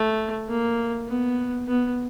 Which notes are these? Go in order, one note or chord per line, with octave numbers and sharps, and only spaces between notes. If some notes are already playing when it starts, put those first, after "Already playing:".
Already playing: A3
A#3
B3
B3